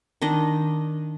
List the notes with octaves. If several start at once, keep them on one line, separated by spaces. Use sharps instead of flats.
D#3 D4 D#5